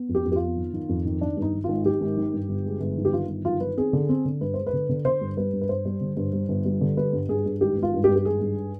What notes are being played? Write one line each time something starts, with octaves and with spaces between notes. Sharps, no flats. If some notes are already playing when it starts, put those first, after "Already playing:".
Already playing: B3
F2
G4
F2
G4
F4
B3
D#3
D#3
F2
D#3
D#3 D4
G2
D#4
D#3
G#1 F4
D#3 G4
G#1
D#3
G2
G1
G#3
G1
D#3
G4
D#3 F4
G1
D#3 F4
D#3 B4
C4 G#4
D3
C4
D3
G2 B4
G#3 C5
B4
D3
D3
D3 C5
G2
G3 B4
G2
B4
G2 C5
G3
D3
G2
G3
G1
G3
D3
G3 B4
G2
G2 G#4
G2
G#1 G4
G#1
F4
G2
G4
G2
G4
G#1 G#4
G2